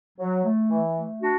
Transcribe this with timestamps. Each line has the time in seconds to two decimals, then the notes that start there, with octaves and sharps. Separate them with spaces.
0.19 F#3
0.45 A3
0.70 E3
0.96 A3
1.21 D4 F#4